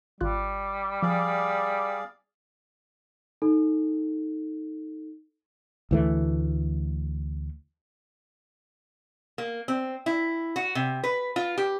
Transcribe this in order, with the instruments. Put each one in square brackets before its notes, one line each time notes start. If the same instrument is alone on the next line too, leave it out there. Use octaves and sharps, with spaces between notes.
[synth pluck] G#1 F4 F#6 [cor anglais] G3
[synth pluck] F3 [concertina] G#4 D5 F5
[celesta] D#4 A4
[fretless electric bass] D2 E3 A3
[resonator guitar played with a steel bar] A#3
C4
E4
F#4
C3
B4
F4
G4